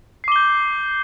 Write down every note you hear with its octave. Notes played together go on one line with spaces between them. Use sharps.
D6 G6 C7 G7